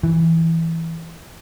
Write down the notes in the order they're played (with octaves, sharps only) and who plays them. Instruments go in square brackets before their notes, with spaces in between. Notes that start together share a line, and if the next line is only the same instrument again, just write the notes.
[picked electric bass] E3